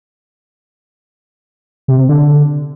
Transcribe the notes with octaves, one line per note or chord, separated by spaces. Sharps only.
C3
C3
D3